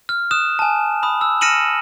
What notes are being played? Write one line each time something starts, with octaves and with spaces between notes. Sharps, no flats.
F6
D#6 F6 F#6 E7
G#5 A5
B5 D#6
E6
F6 A#6 C#7 D#7 E7 F#7